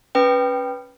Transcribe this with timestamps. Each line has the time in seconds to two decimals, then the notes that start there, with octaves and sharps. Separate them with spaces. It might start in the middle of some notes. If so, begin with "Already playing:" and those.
0.15 C#4 B4 G5